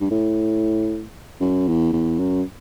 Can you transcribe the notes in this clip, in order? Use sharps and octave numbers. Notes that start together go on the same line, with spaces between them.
G2
A2
F#2
E2
E2
F#2